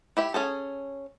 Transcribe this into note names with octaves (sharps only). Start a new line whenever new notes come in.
E4 G4 E5
C#4 G#4 A4